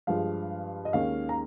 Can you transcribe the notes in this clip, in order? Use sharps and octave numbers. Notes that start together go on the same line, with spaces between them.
G2 F3 G#3 F5
D#5
D#2 D#3 G#3 C#4 F5
A#5